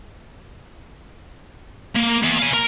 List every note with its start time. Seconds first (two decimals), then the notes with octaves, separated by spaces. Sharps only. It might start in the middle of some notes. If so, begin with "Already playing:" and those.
1.96 A#3
2.23 E2
2.38 F5 G#5
2.54 A#4